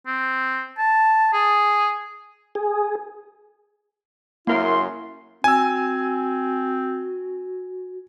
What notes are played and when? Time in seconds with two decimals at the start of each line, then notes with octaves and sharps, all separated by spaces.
0.07 C4
0.78 A5
1.33 G#4
2.55 G#4
4.47 F#2 C#3 A#3 E4 A#4 C6
5.44 C4 F#4 G#5 E6